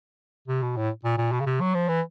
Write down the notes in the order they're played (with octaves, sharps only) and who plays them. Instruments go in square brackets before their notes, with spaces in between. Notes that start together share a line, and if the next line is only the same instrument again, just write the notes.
[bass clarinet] C3
B2
A2
A#2
A#2
B2
C#3
C3
F#3
F3
E3